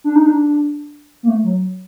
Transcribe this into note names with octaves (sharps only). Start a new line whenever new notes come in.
D4
D#4
D4
A#3
A3
F#3